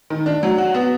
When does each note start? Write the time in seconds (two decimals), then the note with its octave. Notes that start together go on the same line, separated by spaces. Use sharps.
0.10 D#3
0.26 D4
0.43 F#3
0.58 F#4
0.74 B3